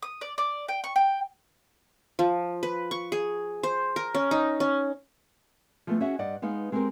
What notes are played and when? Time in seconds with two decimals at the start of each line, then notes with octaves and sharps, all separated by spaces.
0.03 D#6
0.21 D5
0.38 D5
0.69 G5
0.84 C#6
0.96 G5
2.19 F3
2.63 B4
2.91 C#6
3.12 G#4
3.63 C5
3.96 A#4
4.15 C#4
4.31 D#4
4.60 C#4
5.87 F3 G#3 A3 B3
6.00 C#4 F#4 G#4 E5 F#5
6.19 G2 D5 D#5 F#5
6.42 G#3 B3 D#4 F5
6.72 G#3 C4 G4 G#4 A#4 C5